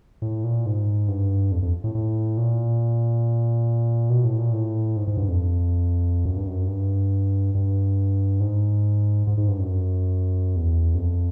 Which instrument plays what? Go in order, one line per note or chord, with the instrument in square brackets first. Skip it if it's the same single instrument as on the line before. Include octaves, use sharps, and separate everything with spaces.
[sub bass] A2
A#2
G#2
G2
F2
F2
A2
A2
A#2
B2
A2
A#2
A2
G#2
G#2
G2
F2
F#2
G2
F#2
G2
G2
G#2
G#2
G#2
G2
F#2
E2
F#2
F2